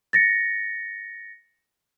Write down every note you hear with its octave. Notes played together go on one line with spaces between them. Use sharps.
A6 A#6 C#7